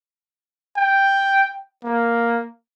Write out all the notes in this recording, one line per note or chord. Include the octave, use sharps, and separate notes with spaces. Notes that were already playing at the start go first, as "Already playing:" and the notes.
G5
A#3